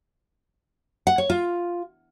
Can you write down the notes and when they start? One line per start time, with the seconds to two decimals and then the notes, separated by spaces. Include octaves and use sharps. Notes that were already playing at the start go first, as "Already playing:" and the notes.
1.07 F#5
1.18 C#5
1.30 F4